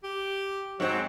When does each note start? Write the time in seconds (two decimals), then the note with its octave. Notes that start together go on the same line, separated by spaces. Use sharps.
0.04 G4
0.80 G#2 F#3 C4